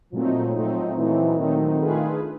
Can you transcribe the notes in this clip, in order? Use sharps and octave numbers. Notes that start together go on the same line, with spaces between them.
A#2 F3 F#3 A3 C4 D#4
A#2 F#3 A3 C4 D#4
A#2 E3 F#3 A3 C4 D#4
A#2 D#3 F#3 A3 C4 D#4
A3 D4 F4 G#4 B4